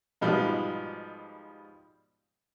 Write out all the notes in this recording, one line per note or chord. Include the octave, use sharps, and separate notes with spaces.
G#2 B2 F3 G3